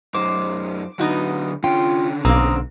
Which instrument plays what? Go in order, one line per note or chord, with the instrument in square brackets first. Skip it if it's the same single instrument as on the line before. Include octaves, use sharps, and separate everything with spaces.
[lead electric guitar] F#2 D#4 [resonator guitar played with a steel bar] C5 [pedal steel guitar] D6
[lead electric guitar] D3 F#3 [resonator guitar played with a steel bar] B3 D#4 F#4
[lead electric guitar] D3 C#4 [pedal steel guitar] F4 [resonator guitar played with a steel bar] G5
[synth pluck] B1 [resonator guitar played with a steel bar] A#3 C4 [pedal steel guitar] A#5 D#6